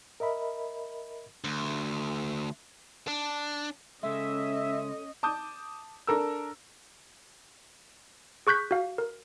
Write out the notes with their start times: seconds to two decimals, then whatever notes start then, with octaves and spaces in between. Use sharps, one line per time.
0.20 A#4 D#5 E5 B5
1.44 D2
3.08 D4
4.03 C#3 G#3 C#4 A4 D#5 E5
5.23 A5 D6 D#6 G6
6.07 D4 A4 A#4 E6
8.47 G#4 C#6 F#6 G6 B6
8.71 F#4 F5
8.98 A#4